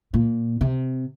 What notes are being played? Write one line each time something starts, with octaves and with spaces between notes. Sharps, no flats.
A#2
C3